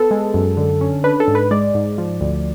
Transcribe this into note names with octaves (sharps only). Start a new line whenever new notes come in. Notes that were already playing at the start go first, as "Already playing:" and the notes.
Already playing: B3 A4
G#3
F#2
D3
C#4
D4 B4
A4
G#2
B4
G#3 D5
G#2
F3
D2